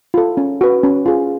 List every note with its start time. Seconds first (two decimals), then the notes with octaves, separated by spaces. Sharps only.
0.14 F4 A4
0.37 C#4
0.61 F#4 B4
0.83 C#4
1.06 F4 G#4